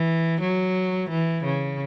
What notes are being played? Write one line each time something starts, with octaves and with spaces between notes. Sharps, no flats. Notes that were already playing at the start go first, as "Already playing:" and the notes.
Already playing: E3
F#3
E3
C#3